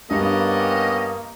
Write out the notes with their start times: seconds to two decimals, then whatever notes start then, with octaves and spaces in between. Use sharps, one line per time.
0.10 G2 G3 A#3 B3 C#4 D#5